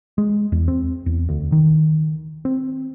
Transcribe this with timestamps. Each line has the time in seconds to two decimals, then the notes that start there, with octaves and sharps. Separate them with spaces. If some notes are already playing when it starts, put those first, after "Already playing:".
0.18 G#3
0.52 E2
0.68 C4
1.06 E2
1.29 D2
1.52 D#3
2.45 C4